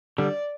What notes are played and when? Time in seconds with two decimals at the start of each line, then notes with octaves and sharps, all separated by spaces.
0.18 D3 G3 D5